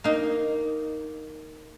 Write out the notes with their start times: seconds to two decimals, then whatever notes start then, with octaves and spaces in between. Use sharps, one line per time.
0.04 A#3 D#4